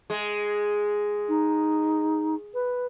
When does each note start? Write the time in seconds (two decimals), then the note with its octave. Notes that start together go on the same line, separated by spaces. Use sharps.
0.10 G#3
1.29 D#4
2.54 B4